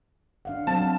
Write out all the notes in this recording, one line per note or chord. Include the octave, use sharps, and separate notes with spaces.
D4 F5 F#5
F#3 C4 D4 A5